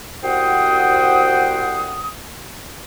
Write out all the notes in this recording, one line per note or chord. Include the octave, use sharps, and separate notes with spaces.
C2 F#4 C5 F#5 G5 D#6